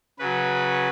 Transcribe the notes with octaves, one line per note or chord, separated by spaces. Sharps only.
C#3 F#3 B4